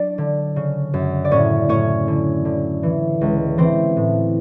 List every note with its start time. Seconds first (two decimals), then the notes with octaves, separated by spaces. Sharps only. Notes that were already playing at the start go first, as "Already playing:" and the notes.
Already playing: F#3 D4 D5
0.18 D3
0.56 C#3
0.93 F#2
1.25 D5
1.31 A2 C#4 C#5
1.69 A2 C#4 C#5
2.08 D3
2.45 D3
2.83 E3
3.21 C#2
3.58 E3 C4 C5
3.97 A2